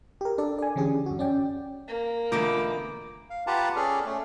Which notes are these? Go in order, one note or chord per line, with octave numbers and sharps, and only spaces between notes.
G4 A#4
D4 A4 D5
D5 G#5
D3 E3 C#4 G4 G#4
F#2 F#4
C#4 D5 G5
A#3
B2 D3 E3 A3 F4 A#5 D6
F5
F4 G4 B4 F#5 A5 A#5
C#4 G#4 A4 D5 F6
A3 C#4